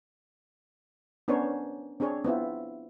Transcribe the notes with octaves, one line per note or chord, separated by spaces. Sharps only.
B3 C#4 D4 A#4 C5 C#5
C4 D4 G#4 C#5
B3 C4 E4 F4